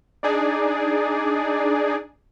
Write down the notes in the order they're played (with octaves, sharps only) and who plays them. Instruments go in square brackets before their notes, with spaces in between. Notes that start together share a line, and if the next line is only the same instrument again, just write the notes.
[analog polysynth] D4 D#4 G#4 D5